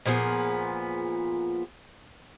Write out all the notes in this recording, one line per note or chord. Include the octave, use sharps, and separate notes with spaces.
A#2 F3 B3 G#4